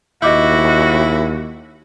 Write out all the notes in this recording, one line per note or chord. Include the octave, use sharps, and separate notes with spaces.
D#2 E4 F#4 D#5 D6 G6